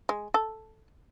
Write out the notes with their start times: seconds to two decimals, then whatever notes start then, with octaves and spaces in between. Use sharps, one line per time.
0.09 G#3
0.34 A4